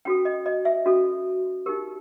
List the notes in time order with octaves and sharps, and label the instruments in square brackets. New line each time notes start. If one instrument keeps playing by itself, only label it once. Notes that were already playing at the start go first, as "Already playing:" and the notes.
[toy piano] C#4 F#4 A4 G5
D#5
D#5
E5
C#4 F#4 A4
D#4 G4 A#4